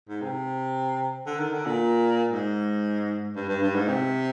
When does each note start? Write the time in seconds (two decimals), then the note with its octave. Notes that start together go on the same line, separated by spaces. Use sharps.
0.09 G#2
0.22 C3
1.26 D3
1.40 D#3
1.53 D3
1.66 A#2
2.31 G#2
3.36 G2
3.49 G2
3.62 G2
3.75 G#2
3.88 C3